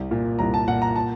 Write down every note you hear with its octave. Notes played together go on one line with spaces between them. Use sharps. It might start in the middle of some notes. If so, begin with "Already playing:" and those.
Already playing: C2
A#2
C2 A#5
A5
A#2 F#5
A#5
A5